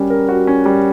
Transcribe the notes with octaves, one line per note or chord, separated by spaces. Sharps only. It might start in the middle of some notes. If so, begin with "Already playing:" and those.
Already playing: G3 C#4 F#4 A#4
A#4
F#4
C#4
G3